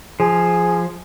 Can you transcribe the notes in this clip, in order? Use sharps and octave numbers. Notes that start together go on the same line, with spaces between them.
F3 G#4